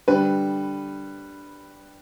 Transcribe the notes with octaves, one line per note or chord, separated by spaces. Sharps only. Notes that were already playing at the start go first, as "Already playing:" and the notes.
D3 G3 B4